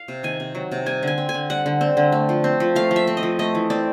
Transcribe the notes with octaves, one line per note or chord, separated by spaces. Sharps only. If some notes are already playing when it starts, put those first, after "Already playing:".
Already playing: F5
C3
D#3 G#5
C3
F#3
C3
G3 G#5
D3 G#5
C4
G#5
D3
G3 F#5
D3
C4
D3
A3
F3
C4
F3
A3 F5
F3
E5
C4
D#5
F3
A3 D#5
E3
C4 D5